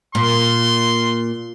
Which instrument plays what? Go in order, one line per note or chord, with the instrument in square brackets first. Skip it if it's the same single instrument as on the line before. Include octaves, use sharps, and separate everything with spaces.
[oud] A#2 [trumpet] C6